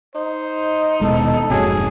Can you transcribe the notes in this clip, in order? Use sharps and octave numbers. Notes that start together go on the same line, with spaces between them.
D#4 C5
D#1 B2 G#3 A4
F1 G#2 C3 F#3 G#4